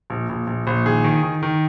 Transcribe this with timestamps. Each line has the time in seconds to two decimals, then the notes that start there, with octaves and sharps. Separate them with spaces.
0.10 A#1
0.29 A#1
0.47 A#1
0.67 A#1
0.85 D#3 G#4
1.04 D#3
1.23 D#3
1.43 D#3